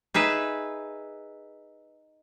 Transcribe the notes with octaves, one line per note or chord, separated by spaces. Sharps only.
D#4 G#4 B4 E5